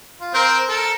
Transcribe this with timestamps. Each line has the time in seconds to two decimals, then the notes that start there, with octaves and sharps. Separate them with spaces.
0.21 F4
0.34 C4 A#4 C5
0.69 A4 A#4